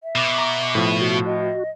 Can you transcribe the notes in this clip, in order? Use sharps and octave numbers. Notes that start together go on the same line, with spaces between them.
E5
B2 D6
A#5
A2 F3
F#4
D#5